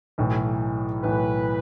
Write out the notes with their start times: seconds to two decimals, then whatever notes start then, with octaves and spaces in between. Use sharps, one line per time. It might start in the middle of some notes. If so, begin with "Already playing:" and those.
0.18 B1 A2 E3
1.03 B1 A2 E3 B4